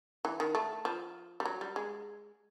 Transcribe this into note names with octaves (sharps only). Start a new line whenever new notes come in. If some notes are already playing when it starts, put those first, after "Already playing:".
E3
D#3
A3
F3
G3
F#3
G3
G#3